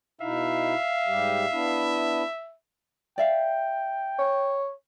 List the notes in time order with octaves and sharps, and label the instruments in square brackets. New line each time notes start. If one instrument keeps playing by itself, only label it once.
[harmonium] B2 D#4 E4 [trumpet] E5 [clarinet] F5
[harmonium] G#2 G3 G4
B3 D4 E4
[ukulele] D5 E5 F5 [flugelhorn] G5
[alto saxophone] C#5